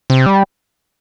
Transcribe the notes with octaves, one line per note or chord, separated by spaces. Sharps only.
C3
G3